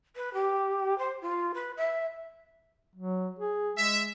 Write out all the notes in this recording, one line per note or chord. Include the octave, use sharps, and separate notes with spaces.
B4
G4
C5
F4
B4
E5
F#3
G#4
G#3 E5